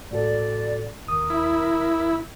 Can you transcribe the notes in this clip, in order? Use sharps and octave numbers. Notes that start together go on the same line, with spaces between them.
A2 F#4 A4 D5
D#2 A#4 D#6
E4